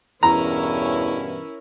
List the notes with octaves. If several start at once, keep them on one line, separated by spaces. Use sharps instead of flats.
E2 G2 B2 E3 C#4 E4 A#4 A#5